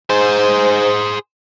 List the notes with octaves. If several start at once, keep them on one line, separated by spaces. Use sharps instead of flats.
G#2 G#4 C5